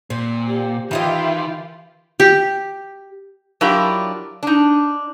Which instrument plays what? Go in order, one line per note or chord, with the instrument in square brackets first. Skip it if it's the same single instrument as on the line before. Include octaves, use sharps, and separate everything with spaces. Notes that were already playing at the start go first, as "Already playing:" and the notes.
[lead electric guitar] A#2 [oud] C4
[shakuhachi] G4
[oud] D#3 E4 D#5 [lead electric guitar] E3 [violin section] F4 G4 [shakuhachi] E5
[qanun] G4
[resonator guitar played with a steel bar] F#3 D4 E4 F4 G4 A#4
D4 D#4